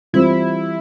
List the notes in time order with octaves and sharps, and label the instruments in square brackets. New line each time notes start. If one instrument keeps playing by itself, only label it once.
[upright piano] E3 G3 C4 F4 C5 [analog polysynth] E4